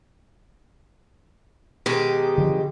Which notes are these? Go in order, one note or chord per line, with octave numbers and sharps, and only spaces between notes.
B2 D#3 G#3 G4
D3 F3